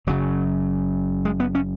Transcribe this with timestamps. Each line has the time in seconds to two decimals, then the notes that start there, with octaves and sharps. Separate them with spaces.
0.07 F#1 F#2 C#3 F#3
1.25 G#3
1.40 B3
1.55 C#4